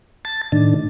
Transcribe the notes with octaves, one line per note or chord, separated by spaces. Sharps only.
A5 A6
A2 D#3 D4